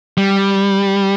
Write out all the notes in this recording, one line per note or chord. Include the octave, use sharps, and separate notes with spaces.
G3